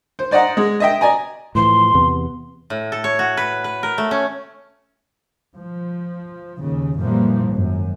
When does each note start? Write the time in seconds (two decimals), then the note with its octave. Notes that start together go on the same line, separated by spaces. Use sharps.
0.19 C5
0.31 C5 D5 D#5 F#5 A#5
0.57 G#3
0.80 D#5 E5 G5
1.01 D5 D#5 G#5 A#5
1.55 A2 E3 F3 C6
1.94 E2 C3 B3
2.70 A2
2.92 A4
3.04 C#5
3.19 F#4
3.37 B4
3.64 B4
3.83 A#4
3.98 A3
4.11 C#4
5.56 F3
6.59 D#2 C#3
6.99 F#2 A#2 E3 F3 G3 A#3
7.48 G#1 F#2